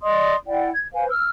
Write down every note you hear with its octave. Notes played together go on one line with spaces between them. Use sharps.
D5 D#5 C6 D#6
E4 D5 F#5 G5
G#6
B4 C5 F5 G#5
E6 F6